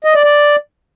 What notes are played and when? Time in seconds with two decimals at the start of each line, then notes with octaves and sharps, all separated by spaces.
0.04 D#5
0.14 D5
0.24 D5